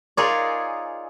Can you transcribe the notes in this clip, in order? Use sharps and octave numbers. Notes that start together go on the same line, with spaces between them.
D#4 F4 G#4 A#4 C#5 D5